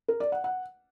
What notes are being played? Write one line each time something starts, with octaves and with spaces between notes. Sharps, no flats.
A#4
D5
F#5
F#5